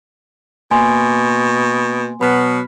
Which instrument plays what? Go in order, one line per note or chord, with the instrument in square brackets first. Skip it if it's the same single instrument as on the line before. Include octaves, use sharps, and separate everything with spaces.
[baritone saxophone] B2 [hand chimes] A#3 [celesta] G#5 C6
[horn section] B2 F#3 B3 [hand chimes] B5 F6 B6